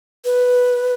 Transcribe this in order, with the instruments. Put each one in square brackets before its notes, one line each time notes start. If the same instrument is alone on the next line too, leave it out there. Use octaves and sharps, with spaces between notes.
[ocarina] B4